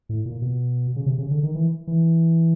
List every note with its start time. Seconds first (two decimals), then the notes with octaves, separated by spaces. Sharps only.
0.09 A2
0.26 A#2
0.42 B2
0.96 C#3
1.06 C3
1.18 C#3
1.31 D3
1.43 D#3
1.55 E3
1.87 E3